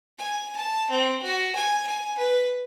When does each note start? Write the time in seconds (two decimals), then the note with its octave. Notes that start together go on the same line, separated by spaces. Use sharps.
0.18 G#5
0.56 A5
0.90 C4
1.22 F#4
1.55 G#5
1.87 G#5
2.18 B4